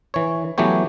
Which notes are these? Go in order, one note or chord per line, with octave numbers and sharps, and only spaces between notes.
E3 C#5
E3 F#3 A3 B3 G4 C#5